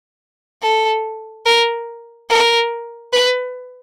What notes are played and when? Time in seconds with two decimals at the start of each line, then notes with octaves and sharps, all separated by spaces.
0.63 A4
1.46 A#4
2.30 A#4
3.13 B4